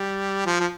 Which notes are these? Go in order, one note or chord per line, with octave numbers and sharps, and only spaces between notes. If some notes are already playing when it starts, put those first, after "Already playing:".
Already playing: G3
F3
F3